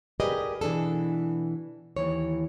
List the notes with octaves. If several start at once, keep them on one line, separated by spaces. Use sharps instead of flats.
G4 G#4 A#4 B4 D5 D#5
B2 E3 D4 G#4 A4
D#2 E3 C#5